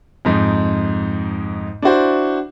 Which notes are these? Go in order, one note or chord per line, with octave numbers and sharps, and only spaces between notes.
F2 G#2 D#4
D4 E4 F#4 C5